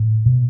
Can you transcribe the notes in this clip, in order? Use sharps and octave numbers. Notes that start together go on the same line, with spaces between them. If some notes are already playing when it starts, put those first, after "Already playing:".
Already playing: A2
B2